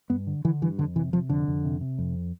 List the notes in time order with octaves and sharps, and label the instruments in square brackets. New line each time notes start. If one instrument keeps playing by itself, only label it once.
[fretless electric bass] G2 B3
D3
D3 E3
G2 E3
F2 D3
C3 E3
C3 F3
F2 D3
F2
C3
C3
F2